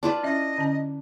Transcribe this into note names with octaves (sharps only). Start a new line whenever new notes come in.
D4 F4 B4
C#4 E4 D#5 E5
D3 C#4 A5